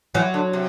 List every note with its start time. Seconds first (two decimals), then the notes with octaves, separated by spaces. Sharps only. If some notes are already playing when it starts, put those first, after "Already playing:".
0.14 E3 F#3
0.34 D3
0.53 C3